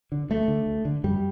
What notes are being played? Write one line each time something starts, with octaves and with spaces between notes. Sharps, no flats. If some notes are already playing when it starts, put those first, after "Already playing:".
D3
D2 A3
D3
D2
D3
F#2 G3